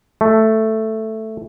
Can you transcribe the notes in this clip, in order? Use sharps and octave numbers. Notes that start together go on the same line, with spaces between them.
A3